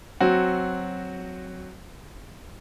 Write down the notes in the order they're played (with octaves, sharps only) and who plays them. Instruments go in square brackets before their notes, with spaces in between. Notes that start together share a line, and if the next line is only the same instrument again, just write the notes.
[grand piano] F#3 C4 F#4